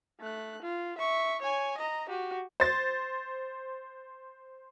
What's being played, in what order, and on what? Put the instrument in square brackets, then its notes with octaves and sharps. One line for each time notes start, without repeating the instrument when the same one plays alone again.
[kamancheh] A3 F#6
F4
E5 C#6
C#5 G#5
D#5 A#5
F#4 G4
[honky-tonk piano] C5 A6